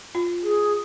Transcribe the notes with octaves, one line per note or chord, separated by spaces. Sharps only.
F4
G#4